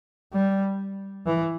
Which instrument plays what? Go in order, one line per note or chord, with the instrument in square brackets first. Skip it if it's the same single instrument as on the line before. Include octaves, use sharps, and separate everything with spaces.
[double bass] G3
E3